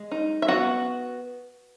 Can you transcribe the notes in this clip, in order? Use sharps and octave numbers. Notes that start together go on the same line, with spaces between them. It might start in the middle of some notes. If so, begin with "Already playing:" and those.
Already playing: G#3
D#4
E5
B3 F#4 F#5